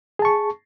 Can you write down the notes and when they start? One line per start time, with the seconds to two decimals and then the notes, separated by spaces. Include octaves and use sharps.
0.19 G#4
0.22 A5
0.25 C#6